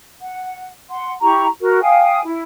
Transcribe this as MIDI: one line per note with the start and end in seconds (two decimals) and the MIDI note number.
0.20 0.66 78
0.89 1.12 78
0.89 1.12 84
1.22 1.45 64
1.22 1.45 67
1.22 1.45 82
1.22 1.45 85
1.60 1.81 66
1.60 1.81 70
1.81 2.20 77
1.81 2.20 79
1.81 2.20 80
1.81 2.20 87
2.23 2.43 64